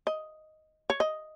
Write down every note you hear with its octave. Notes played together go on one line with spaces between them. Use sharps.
D#5
C#5
D#5